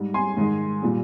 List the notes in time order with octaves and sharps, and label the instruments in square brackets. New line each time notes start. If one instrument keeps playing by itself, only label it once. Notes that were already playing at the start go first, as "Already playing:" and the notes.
Already playing: [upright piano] G#2 G3
G#5 C6
G#2 D#3 G#3
A#2 G3